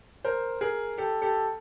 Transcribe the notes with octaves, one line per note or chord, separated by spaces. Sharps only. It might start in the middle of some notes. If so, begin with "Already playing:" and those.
A#4 C5
G#4 A#4
G4 A4
G4 A4